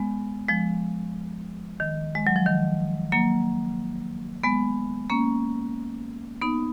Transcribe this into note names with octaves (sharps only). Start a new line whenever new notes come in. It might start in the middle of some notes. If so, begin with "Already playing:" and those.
Already playing: G#3 B3
F3 G#3
D#3
G#3
F#3
F3
D#3
F#3 A#3
G#3 B3
A#3 C#4
B3 D#4